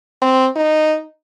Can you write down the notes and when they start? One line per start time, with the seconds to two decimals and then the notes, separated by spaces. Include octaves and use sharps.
0.22 C4
0.56 D#4